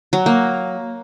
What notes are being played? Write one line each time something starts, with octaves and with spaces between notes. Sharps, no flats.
F#3
A#3